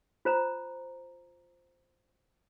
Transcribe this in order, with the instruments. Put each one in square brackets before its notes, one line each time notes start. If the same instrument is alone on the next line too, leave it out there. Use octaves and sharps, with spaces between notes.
[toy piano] F4 C5 A#5